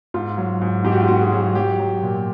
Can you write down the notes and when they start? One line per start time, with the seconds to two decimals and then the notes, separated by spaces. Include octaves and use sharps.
0.14 G#2 F4
0.38 F#3
0.61 G#2
0.84 G#2 G4
0.92 F#4
1.01 F4
1.08 G#2 F#4
1.21 G#4
1.32 F#3
1.55 F#3 G4
1.79 F#3
2.02 A#2